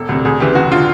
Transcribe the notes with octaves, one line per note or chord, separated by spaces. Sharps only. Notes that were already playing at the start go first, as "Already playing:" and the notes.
Already playing: E1 A4
D2 C3
D2 G#4
C#3 E3 G4
F1 F#4
D3 F4